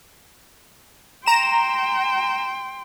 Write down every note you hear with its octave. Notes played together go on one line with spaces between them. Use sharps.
G5 A#5 C6 E7